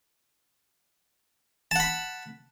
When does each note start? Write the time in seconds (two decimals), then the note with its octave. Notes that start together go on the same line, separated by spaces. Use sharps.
1.71 A5
1.76 F#5
1.80 B5